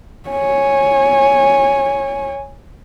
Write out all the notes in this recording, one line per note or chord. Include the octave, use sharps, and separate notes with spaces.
C#5 G#5